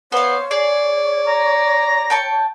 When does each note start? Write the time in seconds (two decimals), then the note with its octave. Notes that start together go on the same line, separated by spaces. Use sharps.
0.12 B3 C5 C#5 F5
0.51 G#4 D5
1.27 A#5
2.10 G5 A5 C#6